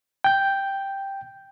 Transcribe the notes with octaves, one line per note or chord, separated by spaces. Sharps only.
G5 G6